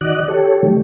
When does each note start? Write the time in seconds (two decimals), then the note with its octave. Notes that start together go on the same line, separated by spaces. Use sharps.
0.01 D#3 F#4 D5 D#5 F#6
0.28 G4 A4 C#5
0.63 C3 D#3 F#3 G3 A3 G4